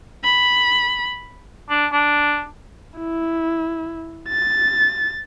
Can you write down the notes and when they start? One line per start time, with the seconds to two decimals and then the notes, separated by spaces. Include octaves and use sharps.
0.24 B5
1.70 D4
1.92 D4
2.99 E4
4.29 A6